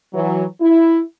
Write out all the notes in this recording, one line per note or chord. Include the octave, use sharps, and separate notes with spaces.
E3 F#3
E4